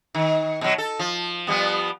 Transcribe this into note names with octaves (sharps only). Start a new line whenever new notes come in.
D#3
B2 F#3
A4
F3
F3 G3 B3